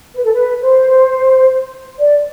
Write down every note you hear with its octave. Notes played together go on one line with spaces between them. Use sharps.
B4
A4
B4
C5
D5